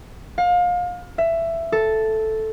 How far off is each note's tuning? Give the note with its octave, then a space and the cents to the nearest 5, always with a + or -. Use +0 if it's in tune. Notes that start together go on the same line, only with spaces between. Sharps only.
F5 +30
E5 +15
A4 -5